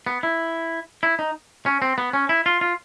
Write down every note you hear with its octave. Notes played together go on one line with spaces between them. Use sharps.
B3
E4
E4
D#4
C#4
C4
B3
C#4
E4
F4
F4